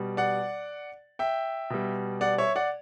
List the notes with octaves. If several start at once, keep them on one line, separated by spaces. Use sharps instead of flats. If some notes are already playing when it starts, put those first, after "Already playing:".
Already playing: B2 G3
D5 F#5
E5 G5
B2 G3
D5 F#5
C#5 E5
D5 F#5